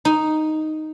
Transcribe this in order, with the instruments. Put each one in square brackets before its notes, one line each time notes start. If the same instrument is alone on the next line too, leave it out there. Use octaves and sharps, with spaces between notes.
[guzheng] D#4